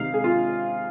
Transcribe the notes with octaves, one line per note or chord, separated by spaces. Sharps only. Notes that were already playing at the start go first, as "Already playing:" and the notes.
Already playing: C3 D#3 G#3 D#4 F5
G#4
F4